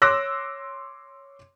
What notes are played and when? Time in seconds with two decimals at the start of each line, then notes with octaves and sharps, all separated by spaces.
0.02 C#5 C6 D6 E6 F#6 A#6